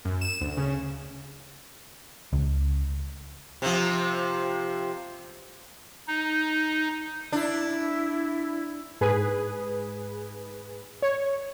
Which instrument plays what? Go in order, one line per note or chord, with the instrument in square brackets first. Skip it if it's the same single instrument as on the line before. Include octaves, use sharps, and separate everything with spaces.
[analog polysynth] F#2
E7
D2
C#3
[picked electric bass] C#2
[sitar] C3 F3
[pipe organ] D#4
[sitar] D4 [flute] E4
[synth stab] G#2 G#4 B4
C#5